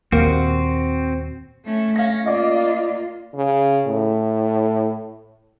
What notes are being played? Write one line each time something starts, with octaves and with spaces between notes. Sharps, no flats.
D#2 A#2 A#3 C4 F#4
A3 C#4
C#4 F5 A#6
A#3 F4 D5 D#5
C#3
A2